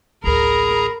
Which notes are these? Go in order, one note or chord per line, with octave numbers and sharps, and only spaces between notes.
A1 D2 G#4 A#4 A#5 B5